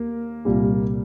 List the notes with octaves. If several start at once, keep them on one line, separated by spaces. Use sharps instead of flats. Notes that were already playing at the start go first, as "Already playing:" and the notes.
Already playing: D#2 A#3 A#4
C2 A#2 G3